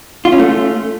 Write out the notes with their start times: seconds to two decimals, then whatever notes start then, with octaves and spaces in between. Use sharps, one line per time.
0.25 F4
0.32 C#4
0.39 A3